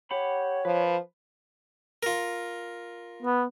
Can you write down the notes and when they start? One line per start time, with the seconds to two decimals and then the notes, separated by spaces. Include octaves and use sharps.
0.11 G4 C#5 F#5 B5
0.65 F3 B4
2.03 F4 A#4
3.23 B3